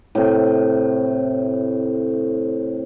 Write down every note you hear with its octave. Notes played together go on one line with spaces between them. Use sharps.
A2 C3